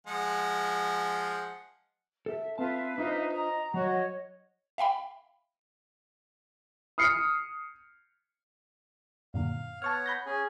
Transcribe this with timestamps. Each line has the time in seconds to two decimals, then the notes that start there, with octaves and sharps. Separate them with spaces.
0.07 F3 G#3 F#5
2.26 A4 E5
2.58 C4 F4 B4 E5 F5 A5
2.98 D4 D#4 F4 C5
3.32 D#5 A#5
3.74 F#3 F#4 C#5 D#5
4.78 E5 F5 G5 B5
6.98 D#6 F6 C7 C#7
9.34 F#2 A#2 D3 F5
9.82 B3 C#5 F#5 A5 C#6 F6
10.06 B5 G6 A#6
10.26 C#4 G#4 G#5